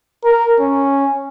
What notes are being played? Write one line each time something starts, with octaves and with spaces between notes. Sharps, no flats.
A#4
C#4